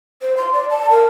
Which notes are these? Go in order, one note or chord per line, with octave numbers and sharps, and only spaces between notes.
C5
C6
D5
A5
A#4